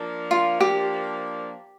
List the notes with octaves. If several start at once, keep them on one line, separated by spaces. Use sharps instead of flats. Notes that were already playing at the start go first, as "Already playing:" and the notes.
Already playing: F3 A#3 D4
F4
G4